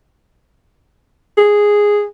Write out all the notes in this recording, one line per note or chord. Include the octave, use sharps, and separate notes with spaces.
G#4